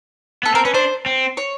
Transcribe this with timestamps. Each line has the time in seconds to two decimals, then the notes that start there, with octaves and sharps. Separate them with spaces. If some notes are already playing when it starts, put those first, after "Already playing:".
0.43 B3 A4
0.54 C4 A#4
0.65 C#4 B4
0.74 D4 C5
1.06 C4
1.37 C#5